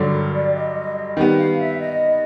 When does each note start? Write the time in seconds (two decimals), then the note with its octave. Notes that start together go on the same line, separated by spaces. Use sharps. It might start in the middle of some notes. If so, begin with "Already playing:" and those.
Already playing: G2 D3 F#3
0.12 A#4
0.33 D5
0.54 D#5
1.17 D#3 G3 B3
1.38 F5
1.59 E5
1.80 D#5